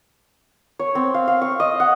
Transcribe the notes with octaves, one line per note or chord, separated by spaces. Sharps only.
C#5
C4
F5
F5
C#6
D#5
F#5